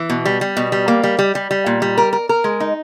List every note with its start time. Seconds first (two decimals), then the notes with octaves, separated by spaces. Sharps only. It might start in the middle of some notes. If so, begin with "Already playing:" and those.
Already playing: E3
0.10 B2
0.25 G3
0.41 G3
0.57 B2
0.72 G3
0.88 A#3
1.04 G3
1.19 G3
1.35 G3
1.51 G3
1.66 A#2
1.82 G3
1.98 A#4
2.13 A#4
2.29 A#4
2.44 G#3
2.60 D#4